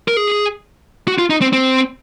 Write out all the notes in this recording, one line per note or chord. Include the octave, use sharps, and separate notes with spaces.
A#4
G#4
F#4
F4
D#4
C4
C4